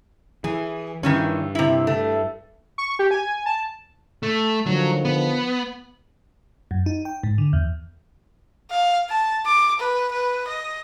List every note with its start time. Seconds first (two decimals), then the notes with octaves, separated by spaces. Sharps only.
0.44 E3 G#4
1.03 G2 D#3 E3 C#4
1.55 C3 E4
1.87 A3
2.78 C#6
2.99 G4
3.11 G#5
3.46 A5
4.23 A3
4.66 D3 D#3 F3 F#3
5.05 B3
6.71 F#2
6.86 D#4
7.05 G5
7.23 G#2
7.38 D3
7.53 E2
8.71 F5
9.09 A5
9.46 D6
9.80 B4
10.12 B4
10.48 D#5